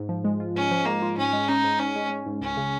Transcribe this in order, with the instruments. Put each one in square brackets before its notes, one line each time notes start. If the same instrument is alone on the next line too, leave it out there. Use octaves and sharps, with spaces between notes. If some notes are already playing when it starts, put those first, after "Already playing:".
Already playing: [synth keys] G#2
F3
G#3
F4
[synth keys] G#2 [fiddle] C#4
[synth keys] F3
[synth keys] G#3 [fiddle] A#3
[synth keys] F4
[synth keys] G#2 [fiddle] C#4
[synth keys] G#3
[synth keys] C#4 [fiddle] D#4
[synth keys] G#2
[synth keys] G#2 [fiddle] C#4
[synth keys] G#3
C#4
G#2
[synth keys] C#2 [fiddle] C#4
[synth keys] C#3